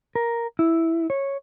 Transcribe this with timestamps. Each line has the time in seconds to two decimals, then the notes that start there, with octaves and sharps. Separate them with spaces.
0.15 A#4
0.59 E4
1.10 C#5